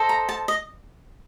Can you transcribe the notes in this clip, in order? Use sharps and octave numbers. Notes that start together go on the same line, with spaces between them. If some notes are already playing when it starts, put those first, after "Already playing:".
Already playing: A4 C5 D#5
A#5
A5
D#5